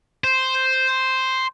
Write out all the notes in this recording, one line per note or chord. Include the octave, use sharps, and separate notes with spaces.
C5